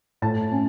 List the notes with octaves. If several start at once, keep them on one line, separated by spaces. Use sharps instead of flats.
A2 A5
C#4